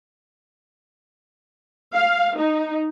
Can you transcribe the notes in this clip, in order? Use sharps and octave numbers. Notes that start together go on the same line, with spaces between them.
F5
D#4